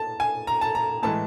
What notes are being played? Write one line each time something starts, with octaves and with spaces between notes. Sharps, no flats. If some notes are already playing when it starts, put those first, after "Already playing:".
Already playing: A5
G#5
A#5
A5
A#5
A2 E3 G#3 A5